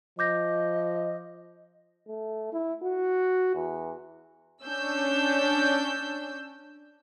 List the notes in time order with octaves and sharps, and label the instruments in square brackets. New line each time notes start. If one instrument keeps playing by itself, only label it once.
[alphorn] F3 [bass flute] D#5 [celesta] D6 G6 A#6
[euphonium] A3
E4
F#4
E2
[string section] C#4 D4 E6 G6